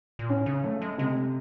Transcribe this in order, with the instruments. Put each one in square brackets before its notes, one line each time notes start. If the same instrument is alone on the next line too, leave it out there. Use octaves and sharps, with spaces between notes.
[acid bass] A#2
[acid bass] A2 [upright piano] C#4
[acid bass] C#3
[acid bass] F#3 [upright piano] A3
[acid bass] G#3
[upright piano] C3 [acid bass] G#3